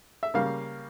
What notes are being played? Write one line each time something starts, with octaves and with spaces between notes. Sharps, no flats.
E5
C#3 G3 A#3 F5